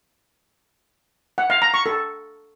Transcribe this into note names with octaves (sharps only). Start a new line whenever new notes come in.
F#5
F5
A#5
C#6
A4